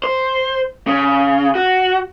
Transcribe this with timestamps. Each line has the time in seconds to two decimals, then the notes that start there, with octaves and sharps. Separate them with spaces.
0.04 C5
0.87 C#3
1.55 F#4